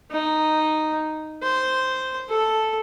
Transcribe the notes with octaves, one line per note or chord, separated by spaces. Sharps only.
D#4
C5
A4